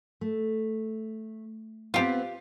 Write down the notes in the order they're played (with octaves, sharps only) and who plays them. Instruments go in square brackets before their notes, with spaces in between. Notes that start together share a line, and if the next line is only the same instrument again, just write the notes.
[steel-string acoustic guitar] A3
[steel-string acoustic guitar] B3 C4 [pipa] F4 G4